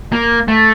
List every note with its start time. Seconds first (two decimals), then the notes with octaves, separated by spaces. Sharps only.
0.12 A#3
0.48 A3